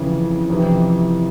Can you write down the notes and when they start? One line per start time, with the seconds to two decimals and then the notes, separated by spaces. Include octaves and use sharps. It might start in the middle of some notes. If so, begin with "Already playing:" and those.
Already playing: F2 C#3 E3
0.50 F2 C3 E3